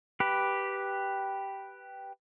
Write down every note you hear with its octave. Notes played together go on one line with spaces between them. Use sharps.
G4 B4